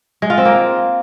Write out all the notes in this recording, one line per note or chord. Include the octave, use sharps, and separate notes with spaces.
G#3
F4
C4
A#3